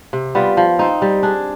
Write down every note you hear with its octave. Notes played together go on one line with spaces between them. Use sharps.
C3
G3 B3 F4
F3
C4 D#4
G3
D4 G#4